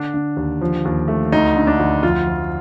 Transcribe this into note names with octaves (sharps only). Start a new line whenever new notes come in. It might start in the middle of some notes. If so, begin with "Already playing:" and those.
Already playing: D3 D4
D3
D#2
F3
D#2
A3
D2 D#4
D3
D4
D2
F2 F4
F3